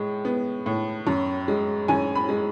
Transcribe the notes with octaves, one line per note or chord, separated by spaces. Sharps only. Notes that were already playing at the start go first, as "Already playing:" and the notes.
Already playing: A2 G#3
B3
A2
F#2
G#3
F#2 G#5
B5
G#3